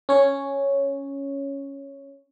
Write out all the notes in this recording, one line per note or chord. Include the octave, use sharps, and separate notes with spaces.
C#4 C#5